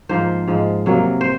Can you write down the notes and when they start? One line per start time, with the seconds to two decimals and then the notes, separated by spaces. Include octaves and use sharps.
0.09 G#2 F3 A#3 C5
0.47 G#2 F3 G#3
0.86 C3 F#3 A#3
1.21 C5